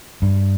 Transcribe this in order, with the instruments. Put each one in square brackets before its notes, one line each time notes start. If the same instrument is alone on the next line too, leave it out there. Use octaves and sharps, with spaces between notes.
[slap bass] G2